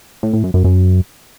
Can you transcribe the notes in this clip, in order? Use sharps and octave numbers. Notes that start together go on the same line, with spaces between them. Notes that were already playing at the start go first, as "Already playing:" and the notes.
A2
A2
F#2
F#2
F#2